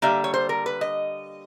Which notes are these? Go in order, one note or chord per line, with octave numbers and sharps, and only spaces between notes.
D3 G3 A#3 E5
C#5
C5
A#4
B4
D#5